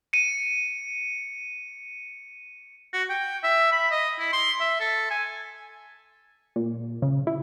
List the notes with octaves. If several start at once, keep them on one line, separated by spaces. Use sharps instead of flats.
C#7 D#7
F#4
G5
E5
B5
D#5
E4
C6
E5
A4
G#5
A#2
C#3
E4